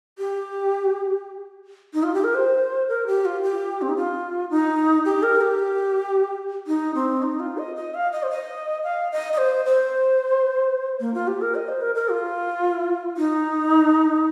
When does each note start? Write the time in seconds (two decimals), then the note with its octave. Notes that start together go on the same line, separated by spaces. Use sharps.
0.19 G4
1.94 D#4
2.03 F4
2.14 G4
2.24 A#4
2.35 C5
2.88 A#4
3.07 G4
3.25 F4
3.43 G4
3.82 C4
3.89 D#4
3.97 F4
4.51 D#4
5.05 G4
5.23 A#4
5.41 G4
6.67 D#4
6.95 C4
7.22 D#4
7.40 F4
7.58 D#5
7.76 D#5
7.95 F5
8.12 D#5
8.23 C5
8.30 D#5
8.84 F5
9.12 D#5
9.33 D#5
9.38 C5
9.65 C5
11.00 A#3
11.14 F4
11.28 G4
11.41 A#4
11.55 D#5
11.69 C5
11.82 A#4
11.95 A#4
12.09 F4
13.17 D#4